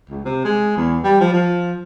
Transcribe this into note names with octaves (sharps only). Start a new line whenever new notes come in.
C#2
C3
G#3
E2
G3
F3
F3